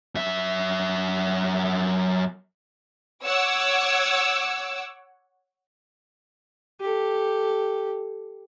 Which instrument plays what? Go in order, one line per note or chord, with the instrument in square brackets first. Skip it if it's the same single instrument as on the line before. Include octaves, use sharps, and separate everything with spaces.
[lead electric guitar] F#2 E5
[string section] C#5 F#5 D6 E6
[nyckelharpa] G4 A4